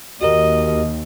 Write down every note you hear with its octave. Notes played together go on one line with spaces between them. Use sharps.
D#2 F#4 G4 A#4 D#5